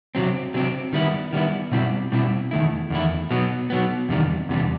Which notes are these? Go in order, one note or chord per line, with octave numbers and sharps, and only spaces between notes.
C3 F#3 C4
C3 F#3 C4
D#3 G3 B3 E4
D#3 G3 B3 E4
B2 G3 C4 E4
B2 G3 C4 E4
E2 D#3 A3 E4
E2 D#3 A3 E4
B2 F#3 B3
B2 F#3 B3
E2 C3 D#3 G3
E2 C3 G3